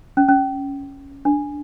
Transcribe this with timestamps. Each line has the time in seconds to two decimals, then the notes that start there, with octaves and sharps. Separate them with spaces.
0.17 C#4
0.29 C#4
1.25 D4